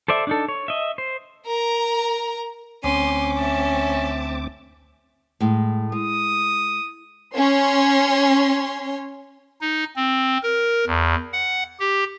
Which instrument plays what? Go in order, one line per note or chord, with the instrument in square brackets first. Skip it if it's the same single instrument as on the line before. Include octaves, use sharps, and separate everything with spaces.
[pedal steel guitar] A4 C5 D5 E5
D4 D#4 A4
C#5
D#5 E5
C5
[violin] A#4 A#5
[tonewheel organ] D2 C4 D6 [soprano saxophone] C#4 [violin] C6 D#7
[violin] E5 A5
[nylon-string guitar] A2 G#3
[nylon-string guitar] G#3 [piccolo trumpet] D#6
[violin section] C#4 C#5 C6
[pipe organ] D#4
C4
A#4
E2
F#5
G4